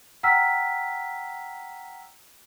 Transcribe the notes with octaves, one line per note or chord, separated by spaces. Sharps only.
F#5 G5 A#5 E6 F6 B6